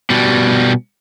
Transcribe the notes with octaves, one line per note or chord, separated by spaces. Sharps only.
B2 G3